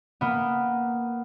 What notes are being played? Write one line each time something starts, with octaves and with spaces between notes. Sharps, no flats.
A#3 B3